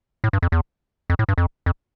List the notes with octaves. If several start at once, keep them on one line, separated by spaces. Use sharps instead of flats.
A2
G2
F2
E2
F2
A2
G2
F2
F2